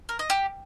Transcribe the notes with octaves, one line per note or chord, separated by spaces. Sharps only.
A#4
D#5
G4